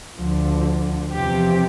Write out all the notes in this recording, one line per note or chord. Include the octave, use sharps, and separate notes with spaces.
D2 D3 F3
E2 C3 F3 G4